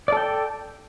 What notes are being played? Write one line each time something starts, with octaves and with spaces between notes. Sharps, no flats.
A4 D5 G5